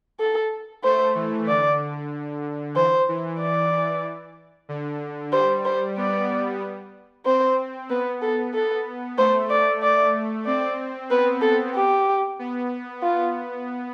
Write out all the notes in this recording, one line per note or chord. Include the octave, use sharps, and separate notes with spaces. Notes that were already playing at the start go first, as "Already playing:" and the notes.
A4
A3 C5
E3
D3 D5
E3 C5
E3
D5
D3
G3 C5
C5
B3 D5
C4 C5
B3 B4
A4
A4
A3 C5
D5
D5
C4 D5
B3 B4
A4
G4
B3
F4